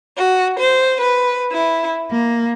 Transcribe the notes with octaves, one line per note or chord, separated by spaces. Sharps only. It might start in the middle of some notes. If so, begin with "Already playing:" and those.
F#4
C5
B4
E4
A#3